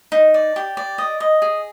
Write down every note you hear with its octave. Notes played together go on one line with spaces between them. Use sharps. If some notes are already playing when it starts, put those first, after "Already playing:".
D#4
D5
G4
D5
D#5
D#5
G#4